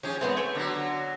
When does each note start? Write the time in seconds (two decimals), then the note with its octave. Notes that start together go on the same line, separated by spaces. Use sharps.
0.03 F3 C#4 G4 G#4
0.21 G#3 A3 B3 C4
0.37 C#5 G5 G#5
0.55 D3 F#3